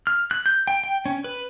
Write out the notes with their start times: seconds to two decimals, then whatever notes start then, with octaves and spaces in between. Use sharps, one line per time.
0.07 F6
0.31 F#6
0.46 G6
0.67 G5
0.84 G5
1.06 C#4
1.24 B4